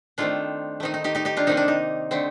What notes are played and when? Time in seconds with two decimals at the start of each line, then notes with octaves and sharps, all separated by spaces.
0.18 D#3 A3 C4 D4 F4
0.80 D#3 A3 C4 D#4
0.94 D#4
1.04 D#4 G4
1.15 D#4 G4
1.25 D#4 G4
1.37 D4 F4
1.47 C3 D#3 A#3 D#4
1.57 D4
1.68 D#4
2.11 D3 A3 C4